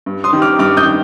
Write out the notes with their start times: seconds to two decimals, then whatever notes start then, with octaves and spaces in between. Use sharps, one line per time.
0.06 G2
0.24 C6 D#6
0.33 D#3 G3
0.42 D6 F6
0.59 G2 D6 F6
0.77 D#6 G6
0.86 D#3